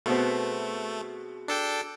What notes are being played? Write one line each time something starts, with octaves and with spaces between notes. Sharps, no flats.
B2 A3 B3 C4 F#4 G#4
D4 A4 G5